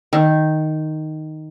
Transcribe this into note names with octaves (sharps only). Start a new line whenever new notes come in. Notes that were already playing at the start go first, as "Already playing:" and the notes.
D#3